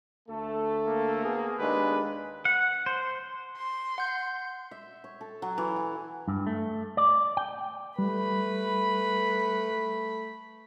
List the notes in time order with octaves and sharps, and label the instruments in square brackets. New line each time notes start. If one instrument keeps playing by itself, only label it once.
[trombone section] D2 A3 A4
[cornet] A#3
[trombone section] B3 G#4
[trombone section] D#2 G#3 D4 [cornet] B4
[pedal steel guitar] F#5
C5
[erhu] C6
[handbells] F#5 G6
[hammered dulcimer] E5
C#5
A4
F#3
E3
G#5
[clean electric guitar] G2
A3
D5
G5
[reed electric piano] G3 [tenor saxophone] A3 [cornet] B4 [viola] B5